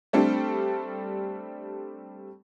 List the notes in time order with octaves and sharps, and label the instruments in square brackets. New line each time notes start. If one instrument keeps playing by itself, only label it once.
[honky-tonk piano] G3 A3 C4 D4 A4